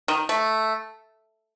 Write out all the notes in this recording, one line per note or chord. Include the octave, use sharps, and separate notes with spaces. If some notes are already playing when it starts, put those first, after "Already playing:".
D#3
A3